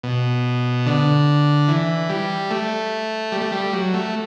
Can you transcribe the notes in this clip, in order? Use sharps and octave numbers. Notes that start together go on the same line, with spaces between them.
B2
D3
E3
G3
A3
G3
A3
G3
F#3
A3